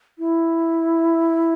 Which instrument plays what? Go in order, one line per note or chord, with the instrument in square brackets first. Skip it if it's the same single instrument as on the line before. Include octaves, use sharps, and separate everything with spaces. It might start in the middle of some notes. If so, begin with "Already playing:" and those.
[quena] E4